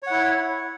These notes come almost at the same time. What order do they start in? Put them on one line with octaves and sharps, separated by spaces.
C#5 F#5 E4